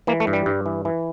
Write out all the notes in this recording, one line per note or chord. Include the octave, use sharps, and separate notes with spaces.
E3 A#3
A3
G2
G3
G2
E3
E3